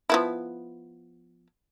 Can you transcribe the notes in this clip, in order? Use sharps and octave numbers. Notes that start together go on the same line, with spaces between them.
F3 B3 E4